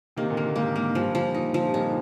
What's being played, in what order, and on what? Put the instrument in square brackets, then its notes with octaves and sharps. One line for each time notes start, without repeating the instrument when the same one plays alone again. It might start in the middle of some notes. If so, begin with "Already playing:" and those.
[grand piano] C3 D#3 [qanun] A#3
[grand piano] A#2 D3
[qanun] A#3
[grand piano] A#2 D3
[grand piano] G#2 C3 [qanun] A#3
[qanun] A#3
[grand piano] G#2
[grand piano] G2 A#2 [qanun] F3
[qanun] F3
D#4
F3
[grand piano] C3
[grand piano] G2 A#2 [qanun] D#4
[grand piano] D3